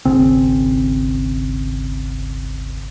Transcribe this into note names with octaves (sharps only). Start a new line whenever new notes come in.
D#1 G#1 C#3 C4